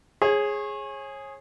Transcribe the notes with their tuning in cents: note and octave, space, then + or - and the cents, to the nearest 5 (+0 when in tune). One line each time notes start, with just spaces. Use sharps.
G#4 +0 C#5 -30